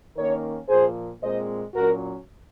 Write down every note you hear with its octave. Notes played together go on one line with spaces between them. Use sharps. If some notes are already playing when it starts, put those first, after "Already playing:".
D#3 A#3 C#4 A#4 C#5
A#2 F3 A#3 G#4 C5
A#2 G#3 C4 C5 D#5
A#2 F#3 C#4 F#4 A#4